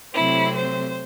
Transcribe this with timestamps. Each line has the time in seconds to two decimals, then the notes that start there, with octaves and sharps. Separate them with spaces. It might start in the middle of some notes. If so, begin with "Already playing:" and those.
0.13 C3 F#3 A3 C4 E4
0.54 C5